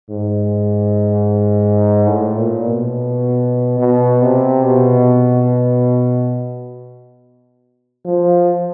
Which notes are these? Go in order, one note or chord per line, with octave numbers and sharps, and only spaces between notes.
G#2
A2
A#2
B2
B2
C3
B2
F3